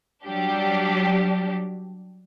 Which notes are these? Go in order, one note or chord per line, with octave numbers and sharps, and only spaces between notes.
F#3 G3 D4 G4